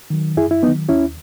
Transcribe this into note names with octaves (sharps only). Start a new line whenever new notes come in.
D#3 F#3
F#2 E4 G#4
E4
D#3 F#3 B3 D#4
D#2 C#4 E4